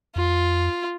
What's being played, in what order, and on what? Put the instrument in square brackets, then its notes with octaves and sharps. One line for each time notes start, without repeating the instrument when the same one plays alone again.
[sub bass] F2 [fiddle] F4